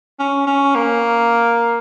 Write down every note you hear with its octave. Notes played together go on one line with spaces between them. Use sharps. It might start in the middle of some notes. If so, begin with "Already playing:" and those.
C#4
C#4
A#3